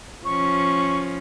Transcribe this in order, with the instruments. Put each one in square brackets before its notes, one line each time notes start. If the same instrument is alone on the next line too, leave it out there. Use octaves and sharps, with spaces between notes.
[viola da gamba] F3 C#4 [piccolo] C#6